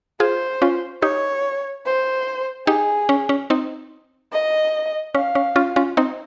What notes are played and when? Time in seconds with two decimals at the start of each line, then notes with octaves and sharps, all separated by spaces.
0.20 F4 G#4 C5
0.62 C#4 F4
1.02 D#4 G4 C#5
1.86 C5
2.67 D#4 G4 G#4
3.09 C#4
3.29 C#4
3.50 C4 D#4
4.32 D#5
5.15 C#4 F5
5.35 C#4
5.56 C#4 F4
5.76 C#4 F4
5.97 C4 D#4